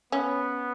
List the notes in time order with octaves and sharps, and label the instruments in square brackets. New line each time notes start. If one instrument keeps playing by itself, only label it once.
[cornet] B3 [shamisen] C#4